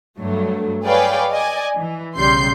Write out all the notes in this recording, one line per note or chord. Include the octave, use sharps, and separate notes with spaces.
G2 F#3 A3
G#4 B4 C#5 D5 F5 G5
D5 D#5 G#5
E3
B1 C#3 G3 C6 G6 C7